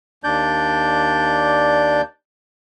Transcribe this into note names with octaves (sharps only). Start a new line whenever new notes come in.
D#2 D4 D5 G6